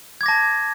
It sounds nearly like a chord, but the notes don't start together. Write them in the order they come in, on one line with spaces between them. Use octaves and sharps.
G#6 D6 A#6 A5